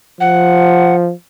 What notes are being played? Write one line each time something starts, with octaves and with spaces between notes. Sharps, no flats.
F3 F#5